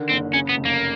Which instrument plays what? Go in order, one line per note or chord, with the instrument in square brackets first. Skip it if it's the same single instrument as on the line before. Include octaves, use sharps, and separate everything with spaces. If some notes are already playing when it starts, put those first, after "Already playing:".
Already playing: [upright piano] D3 D#3
[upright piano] F#1 [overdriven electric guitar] C4
[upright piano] C#3 [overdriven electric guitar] C#4
[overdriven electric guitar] B3
[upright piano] F1
[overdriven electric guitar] A#3